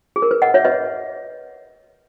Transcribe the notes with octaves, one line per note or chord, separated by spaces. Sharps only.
G#4
A#4
B4
D#5 F#5
C#5 E5
B4 D#5